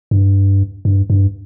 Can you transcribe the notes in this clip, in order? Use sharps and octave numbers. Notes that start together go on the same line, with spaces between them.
G2
G2
G2